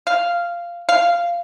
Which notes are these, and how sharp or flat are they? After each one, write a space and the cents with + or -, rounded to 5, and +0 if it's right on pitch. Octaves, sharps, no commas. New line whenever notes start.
F5 -10
F5 -15